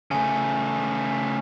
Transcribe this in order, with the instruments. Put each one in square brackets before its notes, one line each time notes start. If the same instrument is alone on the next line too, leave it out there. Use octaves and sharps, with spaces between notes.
[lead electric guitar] C#3 A3 [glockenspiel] G#5